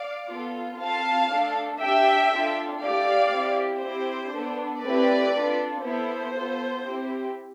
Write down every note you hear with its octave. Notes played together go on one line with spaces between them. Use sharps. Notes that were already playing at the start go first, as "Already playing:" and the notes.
Already playing: D5 F5
B3 F4 A4
C4 F4 A4 F5 A5
A3 D4 A4
D4 G4 E5 G5
D4 F4 A4
A3 E4 G4 D5 F5
C4 E4 G4
C4 E4 G4 C5
B3 D4 A4
A3 C4 E4 G4 B4 D5
D4 F4 A4
B3 E4 A4 C5
B3 F4 A4
C4 E4 G4